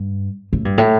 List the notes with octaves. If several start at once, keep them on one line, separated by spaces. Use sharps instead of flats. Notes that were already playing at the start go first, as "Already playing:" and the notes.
Already playing: G2
A2
G2
A2